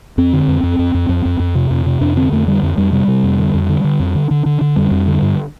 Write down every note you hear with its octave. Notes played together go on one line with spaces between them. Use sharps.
F2 C4
D3
F2
F2
F2
F2
F2
F2
F2
C3
F2
C3
F2 D4
D3 C4
F2 A3
D3 G3
F2
F2 G3
C3 G3
C3
F2
D3
F2
D3
D3
F2
D3
D3
D3
D3
F2 G3
F2
D3
G2